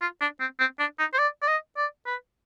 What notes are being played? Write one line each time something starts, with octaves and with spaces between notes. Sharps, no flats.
F4
D4
C4
C4
D4
D#4
C5
D5
D5
D#5
D5
B4